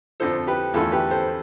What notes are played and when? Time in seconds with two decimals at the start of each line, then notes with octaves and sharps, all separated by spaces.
0.20 F2 D3 F3 A4 C5
0.47 G4 B4
0.74 E2 D3 A3 F4 A4
0.92 G4 B4
1.11 A4 C5